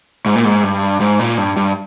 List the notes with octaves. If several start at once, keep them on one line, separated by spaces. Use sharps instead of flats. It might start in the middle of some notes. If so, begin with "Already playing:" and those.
G#2
A#2
G#2
G2
G#2
A#2
G2
G2